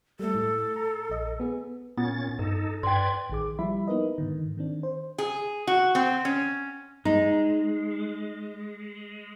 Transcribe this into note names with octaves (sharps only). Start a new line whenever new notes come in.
G3 A3 A4
A2
A#5
A#1 D#5
B3 G#4
A#2 B3 C#4 F4 A6
G2 D#4 A4
G2 B4 D5 G5 C6 G#6
A1 D#3 G#4 D6
F3 G3 E4 E5 B5
A#3 B3 D#4 A#4 B4 D#5
G#2 D3 D#3
D#3 C4 D4
C5
G#4
F#4
C4
C#4
G#3 D#4